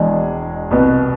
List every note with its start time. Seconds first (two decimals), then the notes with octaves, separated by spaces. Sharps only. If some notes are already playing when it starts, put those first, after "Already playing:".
Already playing: E1 E2 B2 G#3 D4
0.71 C2 B2 B3